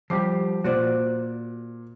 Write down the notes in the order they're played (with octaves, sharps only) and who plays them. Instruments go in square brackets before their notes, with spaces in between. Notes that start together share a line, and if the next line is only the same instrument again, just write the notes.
[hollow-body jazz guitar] F3 G3 G4 [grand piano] D6 C7
[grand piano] A#2 [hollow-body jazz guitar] F#4 C5 D5